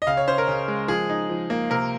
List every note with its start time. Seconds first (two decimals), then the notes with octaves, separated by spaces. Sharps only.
0.02 D#5
0.07 C#3 F5
0.17 C#5
0.27 C#4 C5
0.38 A#4
0.48 C#3
0.68 G#3
0.88 F3 G#4
1.09 D#4
1.29 F3
1.50 A#3
1.70 C3 A#4